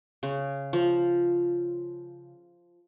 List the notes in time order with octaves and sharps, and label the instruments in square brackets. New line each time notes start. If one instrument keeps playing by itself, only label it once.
[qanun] C#3
F3